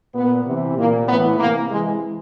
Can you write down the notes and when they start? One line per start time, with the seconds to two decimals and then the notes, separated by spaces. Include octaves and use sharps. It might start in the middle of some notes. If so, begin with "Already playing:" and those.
0.15 A#2 B3
0.46 C3 E3
0.78 A#2 A#3
1.08 A2 B3
1.13 E3
1.39 C3 E3 A#3
1.71 C3 E3 G#3